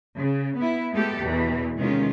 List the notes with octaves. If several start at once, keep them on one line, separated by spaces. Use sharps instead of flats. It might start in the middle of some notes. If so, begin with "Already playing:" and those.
C#3
B3 E4
G#3 A3 B3 G4 A4
E2 B2 E3
C3 D#3 G#3 C#4 F4